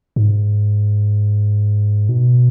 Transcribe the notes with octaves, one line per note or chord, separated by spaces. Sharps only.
G#2
B2